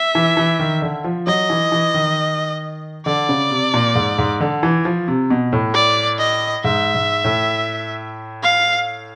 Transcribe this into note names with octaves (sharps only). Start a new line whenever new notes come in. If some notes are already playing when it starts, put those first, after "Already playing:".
Already playing: E5
E3
E3
D#3
D3
F3
F#3 D#5
E3
E3
D#3
D3 D5
C#3
C3
A#2
G#2
G#2
D3
E3
F3
C3
B2
A2
D5
D#5
G#2 E5
G#2
A2
F5